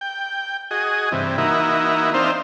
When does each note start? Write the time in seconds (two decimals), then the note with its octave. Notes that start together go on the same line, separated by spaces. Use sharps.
0.01 G5
0.71 F#4 G#4 D#5
1.12 G2 C3 E3
1.38 E3 A#3 D#4 E4 F#4
2.14 C4 D4 D#4 C5 E5 F5